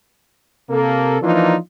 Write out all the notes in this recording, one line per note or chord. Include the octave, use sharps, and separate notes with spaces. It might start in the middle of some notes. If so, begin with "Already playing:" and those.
C3 A#3 A4
E3 F3 A#3 D4 D#4 F4